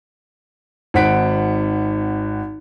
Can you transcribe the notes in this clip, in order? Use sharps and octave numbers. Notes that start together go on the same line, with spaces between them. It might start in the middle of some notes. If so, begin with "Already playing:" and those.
G#1 C4 D#4 F#5 B6 D7